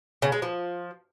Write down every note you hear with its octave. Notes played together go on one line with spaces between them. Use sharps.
C#3
G#3
F3